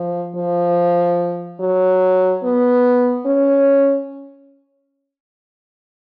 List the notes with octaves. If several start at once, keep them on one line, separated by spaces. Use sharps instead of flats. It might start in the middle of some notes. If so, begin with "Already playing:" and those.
Already playing: F3
F3
F#3
B3
C#4